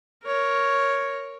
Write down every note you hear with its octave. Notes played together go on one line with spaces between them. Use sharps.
A#4 C#5